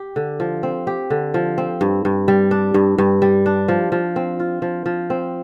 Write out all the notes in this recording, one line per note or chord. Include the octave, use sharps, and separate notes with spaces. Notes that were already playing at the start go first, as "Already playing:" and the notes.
Already playing: G4
D3
F3
C4
G4
D3
F3
C4
G2
G2
G3
D4
G2
G2
G3
D4
F3
F3
C4
F4
F3
F3
C4